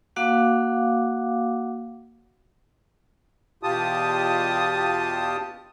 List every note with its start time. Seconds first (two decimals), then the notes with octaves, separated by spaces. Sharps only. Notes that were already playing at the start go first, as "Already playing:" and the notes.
0.16 A#3 F#4 F5 F#5 D6
3.63 E2 B2 F4 G4 A5 D#6